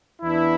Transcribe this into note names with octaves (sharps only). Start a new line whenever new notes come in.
E2 E3 B3 D4 E4